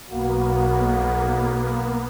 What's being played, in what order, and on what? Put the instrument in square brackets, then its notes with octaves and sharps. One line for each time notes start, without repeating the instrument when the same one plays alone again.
[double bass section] B1 [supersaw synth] A#3 B3 [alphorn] F#4